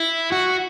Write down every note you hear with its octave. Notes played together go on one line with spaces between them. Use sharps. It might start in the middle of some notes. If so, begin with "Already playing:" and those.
Already playing: E4
F#4